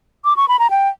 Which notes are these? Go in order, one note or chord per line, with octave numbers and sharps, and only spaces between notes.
D6
C#6
B5
A#5
G5